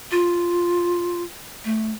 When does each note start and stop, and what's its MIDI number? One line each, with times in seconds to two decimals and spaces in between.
0.11 1.23 65
1.65 1.91 57